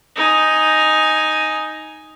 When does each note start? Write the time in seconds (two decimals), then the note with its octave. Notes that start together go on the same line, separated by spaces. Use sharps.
0.16 D#4 G#5